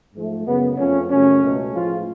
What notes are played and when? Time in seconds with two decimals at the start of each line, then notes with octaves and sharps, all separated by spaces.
0.14 G#2 F3 A3
0.45 F#2 C#3 G#3 B3
0.78 F2 F3 A3 C#4
1.10 F#2 C#3 F#3 A3 C#4
1.42 C#2 B2 A3
1.74 A2 F3 G#3 F4